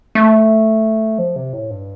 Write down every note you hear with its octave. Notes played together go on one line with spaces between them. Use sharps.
A3
F3
C3
A2
G2